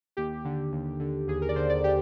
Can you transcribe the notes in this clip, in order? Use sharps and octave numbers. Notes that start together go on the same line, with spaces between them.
D#2 G4
D3
D#2
D3
D#2 G#4
A#4
D5
D3 C5
D5
G4